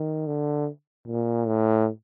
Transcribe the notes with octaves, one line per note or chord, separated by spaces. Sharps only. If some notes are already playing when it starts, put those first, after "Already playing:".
Already playing: D#3
D3
A#2
A2